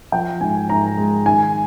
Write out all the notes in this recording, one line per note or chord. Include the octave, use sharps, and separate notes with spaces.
F3 G5
G#2 G#5
G#2 A#5
G#3
D#3 G#5